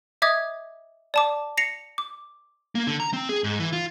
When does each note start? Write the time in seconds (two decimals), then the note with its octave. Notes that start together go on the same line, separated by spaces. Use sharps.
0.22 D#5 E5 D6 D#6 G#6
1.14 D5 A5 D6
1.57 A#6 C7 C#7 F7
1.98 D6
2.75 A#3
2.87 D3
3.00 A#5
3.13 C4
3.29 G#4
3.44 G#2
3.60 E3
3.73 F4